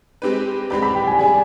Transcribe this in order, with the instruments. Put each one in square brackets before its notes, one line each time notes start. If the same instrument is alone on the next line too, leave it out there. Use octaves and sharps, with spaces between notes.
[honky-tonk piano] G#3 C4 G4 B4
[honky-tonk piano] G#3 C4 G4 D5 [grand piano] B5
[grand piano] B5
G5
G#5
[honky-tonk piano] G3 D4 G#4 D5 [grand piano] G#5